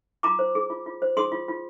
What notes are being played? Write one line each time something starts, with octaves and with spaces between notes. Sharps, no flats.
F4 A#5 D6
C5
G#4
F4
F4
C5
G#4 C6 D#6
F4
F4